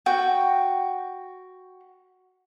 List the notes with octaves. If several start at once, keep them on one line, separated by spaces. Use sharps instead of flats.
F#4 G5